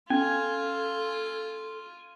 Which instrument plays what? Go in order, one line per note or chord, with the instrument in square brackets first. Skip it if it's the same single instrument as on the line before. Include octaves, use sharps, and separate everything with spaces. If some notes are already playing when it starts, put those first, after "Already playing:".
[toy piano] C#4 [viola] F4 [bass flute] A4 [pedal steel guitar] G#5